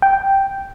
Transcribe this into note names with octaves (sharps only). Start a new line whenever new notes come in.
G5